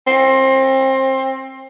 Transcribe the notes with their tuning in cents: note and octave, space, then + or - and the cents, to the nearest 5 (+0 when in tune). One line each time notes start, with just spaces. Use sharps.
C4 +25